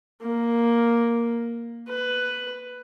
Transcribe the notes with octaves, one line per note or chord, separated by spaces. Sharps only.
A#3
B4